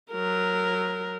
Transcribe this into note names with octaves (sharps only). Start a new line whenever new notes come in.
F#3 A#4